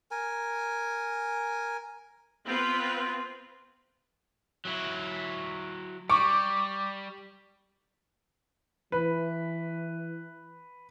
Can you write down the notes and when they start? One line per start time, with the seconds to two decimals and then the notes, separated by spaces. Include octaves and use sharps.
0.11 A#4 G#5
2.44 B3 C4 F4 B4
4.65 F#3 E4
6.10 G3 C#6 D6
8.92 E3 B4